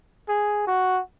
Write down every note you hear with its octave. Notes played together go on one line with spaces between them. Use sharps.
G#4
F#4